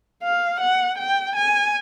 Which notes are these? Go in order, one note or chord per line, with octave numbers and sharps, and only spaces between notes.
F5
F#5
G5
G#5